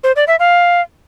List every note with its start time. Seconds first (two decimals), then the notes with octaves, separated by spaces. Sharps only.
0.04 C5
0.16 D5
0.27 E5
0.39 F5